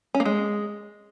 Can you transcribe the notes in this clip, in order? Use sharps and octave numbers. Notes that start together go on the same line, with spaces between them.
C#4
A#3
G#3